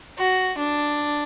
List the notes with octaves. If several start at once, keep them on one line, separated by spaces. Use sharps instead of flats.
F#4
D4